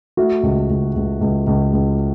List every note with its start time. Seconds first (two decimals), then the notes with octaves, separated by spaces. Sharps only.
0.17 A3 F#4
0.43 C#2
0.70 C#2
0.96 C#2
1.21 C#2
1.47 C#2
1.73 C#2